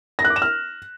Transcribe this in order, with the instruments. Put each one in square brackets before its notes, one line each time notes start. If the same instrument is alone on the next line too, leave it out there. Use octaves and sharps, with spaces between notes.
[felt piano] A#6
F#6
D6
E7
F6